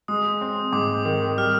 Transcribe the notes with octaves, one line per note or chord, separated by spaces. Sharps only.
G#3 D#6
C4
G#2 D6
D#3
G3 F6